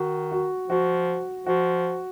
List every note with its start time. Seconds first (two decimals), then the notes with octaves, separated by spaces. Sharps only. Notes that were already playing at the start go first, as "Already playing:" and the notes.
Already playing: D#3 F#4
0.31 F#4
0.70 F3 F#4
1.46 F3 F#4